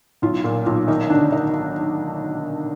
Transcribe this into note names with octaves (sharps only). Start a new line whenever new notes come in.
B1 F4
A#2 F4
B1 F4
D#3 D#4
D2 D4
D#3 D#4